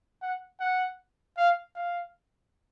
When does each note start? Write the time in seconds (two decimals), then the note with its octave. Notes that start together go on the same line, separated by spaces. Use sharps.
0.22 F#5
0.60 F#5
1.37 F5
1.75 F5